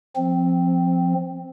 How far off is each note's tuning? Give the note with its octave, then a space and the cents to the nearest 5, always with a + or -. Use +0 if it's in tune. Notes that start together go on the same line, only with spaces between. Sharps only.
F3 +0 C4 +0